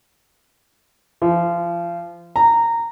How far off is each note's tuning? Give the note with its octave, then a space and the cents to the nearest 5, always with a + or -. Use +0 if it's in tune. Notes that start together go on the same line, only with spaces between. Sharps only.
F3 -30
A#5 -15